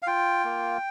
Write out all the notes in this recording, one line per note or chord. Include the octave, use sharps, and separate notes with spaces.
F5
F4 G5
A#3